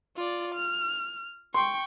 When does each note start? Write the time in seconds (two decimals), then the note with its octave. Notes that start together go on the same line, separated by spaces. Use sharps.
0.16 F4 D5
0.55 F6
1.54 G5 C6 C#6